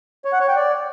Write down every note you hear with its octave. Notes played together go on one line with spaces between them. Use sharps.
C#5
F#5
C#5
G5
D5